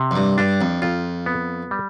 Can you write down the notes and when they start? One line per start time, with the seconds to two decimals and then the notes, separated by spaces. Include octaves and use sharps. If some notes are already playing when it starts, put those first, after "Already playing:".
Already playing: C3
0.11 F2
0.16 G2
0.38 G2 D4
0.61 F2
0.82 F2 F4
1.26 B3
1.71 G3